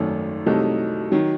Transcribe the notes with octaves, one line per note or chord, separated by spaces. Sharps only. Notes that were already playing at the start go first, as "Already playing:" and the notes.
Already playing: G#1 F#2 D#3 A3
C2 C3 F#3 A3 D#4
D#3 F#3